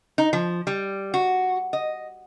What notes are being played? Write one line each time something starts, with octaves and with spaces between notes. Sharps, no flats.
D#4
F3
G3
F#4
D#5